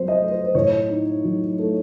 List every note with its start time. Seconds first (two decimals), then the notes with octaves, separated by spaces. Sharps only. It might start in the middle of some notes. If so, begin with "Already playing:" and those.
Already playing: F#3 C4 C5
0.08 D#5
0.20 A3
0.32 C5
0.46 C5
0.55 A2 C#5
0.90 D#4
1.24 F#3
1.59 A3